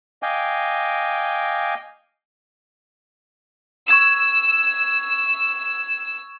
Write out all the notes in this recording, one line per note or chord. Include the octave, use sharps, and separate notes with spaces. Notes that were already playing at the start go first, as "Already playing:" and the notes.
D#5 F5 G5 G#5 D6
C#6 E6 G#6 E7